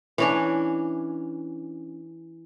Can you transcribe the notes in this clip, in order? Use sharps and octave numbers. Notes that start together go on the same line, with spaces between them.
E3 C#4 D4